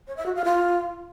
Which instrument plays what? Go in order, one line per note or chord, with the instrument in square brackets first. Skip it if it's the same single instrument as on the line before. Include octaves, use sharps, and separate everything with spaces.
[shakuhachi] C#5
E5
F#4
F5
F4